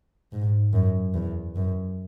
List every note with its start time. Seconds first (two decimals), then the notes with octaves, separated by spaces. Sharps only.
0.32 G#2
0.73 F#2
1.14 E2
1.56 F#2